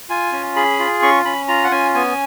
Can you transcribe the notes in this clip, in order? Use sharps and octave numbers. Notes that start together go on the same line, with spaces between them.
F4 G#5
C#4
G#4 B5
F4
C#4 C#6
C#4 B5
F4 A#5
F#5
C#4 G#5
B3 G#5